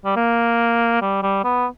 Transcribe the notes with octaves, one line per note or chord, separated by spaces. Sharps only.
G3
A#3
G3
G3
B3